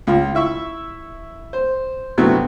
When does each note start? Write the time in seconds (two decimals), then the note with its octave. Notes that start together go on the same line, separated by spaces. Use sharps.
0.07 C#2 F4
0.35 E4 E5 C#6
1.53 C5
2.18 G2 C3 F#3 A3 B3 E4